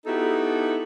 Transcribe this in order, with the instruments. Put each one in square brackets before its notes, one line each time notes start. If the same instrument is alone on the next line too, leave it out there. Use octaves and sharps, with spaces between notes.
[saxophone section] B3 D#4 E4 F#4 G4 A4